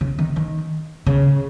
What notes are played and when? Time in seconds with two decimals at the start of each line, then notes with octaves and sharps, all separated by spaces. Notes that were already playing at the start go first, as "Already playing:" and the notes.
0.01 C#3
0.19 D#3
0.36 D#3
1.07 C#3